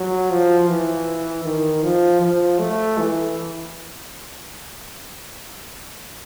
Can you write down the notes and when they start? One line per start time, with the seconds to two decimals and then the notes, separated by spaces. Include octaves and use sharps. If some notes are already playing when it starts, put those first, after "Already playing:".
Already playing: F#3
0.31 F3
0.69 E3
1.45 D#3
1.83 F3
2.21 F3
2.60 A3
2.98 E3